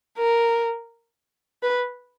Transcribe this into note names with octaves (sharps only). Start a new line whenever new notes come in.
A#4
B4